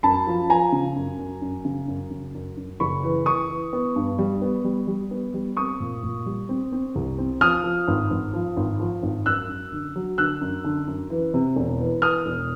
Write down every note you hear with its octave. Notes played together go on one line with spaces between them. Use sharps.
F#2 A5 B5
F3
F3 G#5 A#5
C#3
F#2
F#2
F#2
C#3
F#2
C#3
F#2
F#2
F#1 B5 C#6
E3
E3 C#6 D#6
E3
B3
G2
G3
B3
G3
G3
B3
G3
C4 C#6 D#6
A#2
A#2
G3
C4
C4
C2
C4
F3 D#6 F6
F3
G#1
G#1
F3
G#1
F3
G#1
F#2 E6 F#6
F#2
D3
F#3
D3 E6 F#6
F#2
D3
F#2
E3
C3
E1
E3
E3 D#6 F6
E1